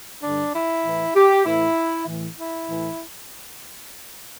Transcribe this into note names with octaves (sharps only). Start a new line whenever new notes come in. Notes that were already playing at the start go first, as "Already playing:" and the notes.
G2 D3 D4
E4
A2 E3
G4
A2 E3 E4
A2 E3
E4
A2 E3